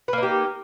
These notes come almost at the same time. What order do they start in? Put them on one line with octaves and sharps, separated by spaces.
B4 A#3 D#4 G4